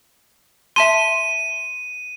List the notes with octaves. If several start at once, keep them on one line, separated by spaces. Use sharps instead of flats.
E5 A5 C6 D#7